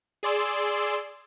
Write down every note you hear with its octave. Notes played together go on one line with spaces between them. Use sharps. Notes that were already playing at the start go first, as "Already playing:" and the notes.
G#4 D5 C6 E6